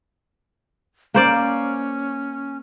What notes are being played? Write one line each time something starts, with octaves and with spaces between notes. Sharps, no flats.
A#3 C#4 C5 D5